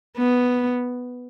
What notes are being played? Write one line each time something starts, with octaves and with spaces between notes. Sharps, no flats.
B3